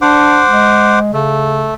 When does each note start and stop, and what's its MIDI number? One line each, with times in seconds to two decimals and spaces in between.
0.02 0.43 62
0.02 0.99 72
0.02 0.99 78
0.02 0.99 86
0.50 1.13 56
1.13 1.71 49
1.13 1.74 57